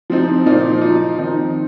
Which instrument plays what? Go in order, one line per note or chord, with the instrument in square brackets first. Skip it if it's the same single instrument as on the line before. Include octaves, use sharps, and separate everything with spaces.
[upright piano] F3 C4 D#4
A#2 F3 D#4
F3 D#4
D#3 C4 D#4